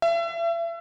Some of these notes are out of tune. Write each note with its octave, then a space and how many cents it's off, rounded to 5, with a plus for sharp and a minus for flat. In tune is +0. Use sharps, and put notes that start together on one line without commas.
E5 +35